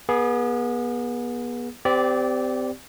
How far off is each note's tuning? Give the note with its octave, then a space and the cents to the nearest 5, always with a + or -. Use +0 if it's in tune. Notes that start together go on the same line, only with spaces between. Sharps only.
B3 -35 G#4 +0
C4 -35 G4 +0 D5 -15